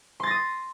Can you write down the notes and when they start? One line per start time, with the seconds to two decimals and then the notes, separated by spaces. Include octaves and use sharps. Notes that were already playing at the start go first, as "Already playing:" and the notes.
0.20 C6
0.23 A6
0.27 A#6
0.31 D#6